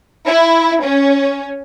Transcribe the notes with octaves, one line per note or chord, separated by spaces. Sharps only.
E4
C#4